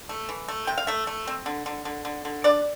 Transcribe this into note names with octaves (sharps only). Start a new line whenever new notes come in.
A3
E3
A3
C3 G5
F5
A3 E5
A3
C4
D3
D3
D3
D3
D3
D4 D5